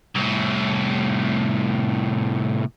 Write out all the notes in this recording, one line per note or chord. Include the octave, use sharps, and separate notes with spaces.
C2 A2